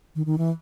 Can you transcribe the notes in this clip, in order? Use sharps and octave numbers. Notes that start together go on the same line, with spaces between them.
D#3
D#3
E3